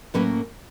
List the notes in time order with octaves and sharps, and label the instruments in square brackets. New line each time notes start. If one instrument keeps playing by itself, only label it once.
[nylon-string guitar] A2 F#3 A#3 C#4 B4